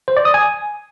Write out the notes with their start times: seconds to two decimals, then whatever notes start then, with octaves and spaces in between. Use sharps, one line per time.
0.08 C5
0.17 D5
0.25 D#6
0.34 G#5